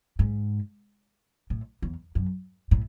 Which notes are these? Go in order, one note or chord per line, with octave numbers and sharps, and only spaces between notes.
G#2
A2
E2
F#2
A2